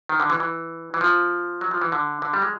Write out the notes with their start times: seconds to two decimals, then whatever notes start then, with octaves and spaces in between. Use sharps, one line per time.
0.09 D#3
0.20 D3
0.30 E3
0.40 E3
0.94 E3
1.01 F3
1.61 F#3
1.71 F3
1.81 E3
1.92 D3
2.22 D3
2.33 G3
2.42 G#3